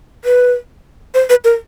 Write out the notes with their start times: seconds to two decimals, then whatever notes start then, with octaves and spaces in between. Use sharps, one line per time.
0.25 B4
1.14 C5
1.30 B4
1.44 A#4